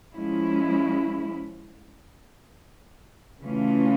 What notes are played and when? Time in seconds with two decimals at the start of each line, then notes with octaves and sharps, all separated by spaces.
0.14 F3 G#3 C#4 E4
3.40 C#3 E3 A3 C#4 F4